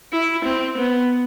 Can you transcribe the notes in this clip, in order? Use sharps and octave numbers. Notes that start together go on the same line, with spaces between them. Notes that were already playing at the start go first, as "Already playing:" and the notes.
E4
C4
B3